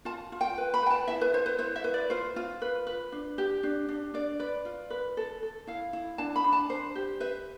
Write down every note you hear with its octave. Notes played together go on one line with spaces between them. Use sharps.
F4 A5
F4
G5
B4
B5
B4 G5
A5
E4 E5
B4
E4 C5
B4
E4 C5
E5
B4
D5
F4 C5
F4
B4
B4
D4
G4
D4
D4
D4 D5
B4 D5
F4
B4
A4
A4
E4 F5
E4
D4 A5
B5
D4
A5
D4 C5
G4
B4 E5